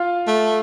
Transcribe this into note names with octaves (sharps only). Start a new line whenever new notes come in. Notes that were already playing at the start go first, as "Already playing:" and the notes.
Already playing: F4 F5
A3